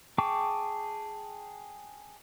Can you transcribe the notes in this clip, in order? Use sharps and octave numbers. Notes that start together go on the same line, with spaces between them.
G#4 G5 A5 C#6 D6